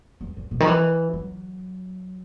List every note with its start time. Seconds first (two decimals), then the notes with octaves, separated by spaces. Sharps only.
0.21 E2
0.37 E2
0.51 B2
0.60 D#3
0.67 E3
1.13 F#3